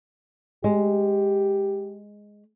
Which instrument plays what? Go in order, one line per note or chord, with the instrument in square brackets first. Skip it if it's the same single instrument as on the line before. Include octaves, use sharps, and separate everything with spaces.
[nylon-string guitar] G#3 [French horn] G4